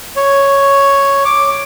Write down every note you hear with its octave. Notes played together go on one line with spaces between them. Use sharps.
C#5
D6